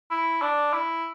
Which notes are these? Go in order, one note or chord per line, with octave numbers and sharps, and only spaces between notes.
E4
D4
E4